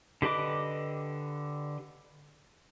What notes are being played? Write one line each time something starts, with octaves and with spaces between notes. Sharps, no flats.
D3 G4 B4 D#5 D6